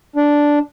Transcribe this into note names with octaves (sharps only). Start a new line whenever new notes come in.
D4